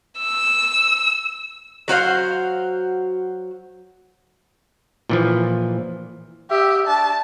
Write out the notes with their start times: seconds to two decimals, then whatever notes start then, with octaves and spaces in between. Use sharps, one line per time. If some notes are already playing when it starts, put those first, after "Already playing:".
0.19 E6
1.88 F#3 F#4 C5 F5
5.09 A#2 E3 F3
6.50 G4 E5
6.87 D4 A5